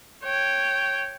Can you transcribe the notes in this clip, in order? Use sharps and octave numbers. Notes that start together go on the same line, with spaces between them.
C#5 G5